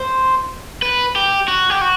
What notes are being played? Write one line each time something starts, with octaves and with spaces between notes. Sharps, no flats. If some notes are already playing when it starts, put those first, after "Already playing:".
Already playing: C5
B4
G4
F#4
G4
F#4